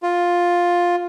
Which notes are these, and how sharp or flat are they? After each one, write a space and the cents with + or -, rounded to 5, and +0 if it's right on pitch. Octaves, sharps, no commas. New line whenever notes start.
F4 +10